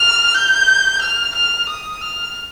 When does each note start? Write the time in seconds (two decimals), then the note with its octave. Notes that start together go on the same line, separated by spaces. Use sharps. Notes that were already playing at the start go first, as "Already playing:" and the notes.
Already playing: F6
0.34 G6
1.01 F6
1.35 F6
1.69 D#6
2.01 F6